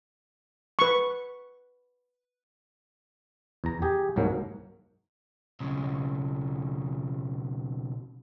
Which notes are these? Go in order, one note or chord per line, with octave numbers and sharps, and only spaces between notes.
B4 C#6
E2 A#5
G4 G#4
C2 G#2 F#3 A#3
B1 C#3